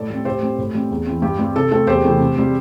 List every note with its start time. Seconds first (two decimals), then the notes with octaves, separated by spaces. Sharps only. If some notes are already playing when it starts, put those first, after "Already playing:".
Already playing: A2 A4 D5
0.10 G3 C4
0.25 A2 G4 C5
0.42 G3 C4
0.58 A2
0.74 G3 C4
0.91 E2
1.06 E3 C4
1.22 G2 G4
1.39 G3 C4
1.56 C3 A4
1.71 A3 C4 A4
1.87 E2 G4 C5
2.04 C3 E3 A3 C4
2.20 C3
2.36 G3 C4